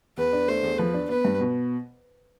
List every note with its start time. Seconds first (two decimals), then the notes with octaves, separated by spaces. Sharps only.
0.17 E2 B4
0.33 D4
0.48 A3 C5
0.63 E2
0.78 F3 B4
0.94 D4
1.09 B3 B4
1.25 G2
1.40 B2